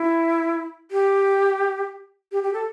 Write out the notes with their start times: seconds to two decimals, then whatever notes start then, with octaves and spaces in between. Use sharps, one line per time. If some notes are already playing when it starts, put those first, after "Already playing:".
Already playing: E4
0.91 G4
2.32 G4
2.43 G4
2.53 A4